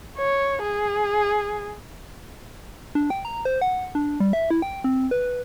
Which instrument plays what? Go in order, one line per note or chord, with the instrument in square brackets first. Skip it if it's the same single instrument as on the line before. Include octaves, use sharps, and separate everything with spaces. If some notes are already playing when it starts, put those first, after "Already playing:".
[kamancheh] C#5
G#4
[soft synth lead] D4
G5
A#5
C5
F#5
D4
G3
E5
E4
G5
C4
B4